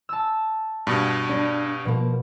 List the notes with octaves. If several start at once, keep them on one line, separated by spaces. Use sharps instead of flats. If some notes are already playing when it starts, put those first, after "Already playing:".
A5 E6
G2 B2
D4
B2 F3 A#3